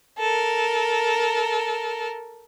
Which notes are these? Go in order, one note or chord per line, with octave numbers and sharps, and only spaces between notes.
A4 A#4